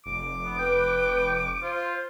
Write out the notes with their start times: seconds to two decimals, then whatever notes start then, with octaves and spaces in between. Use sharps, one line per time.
0.06 F1 D6
0.45 B3
0.59 B4 G5
1.62 F4 C5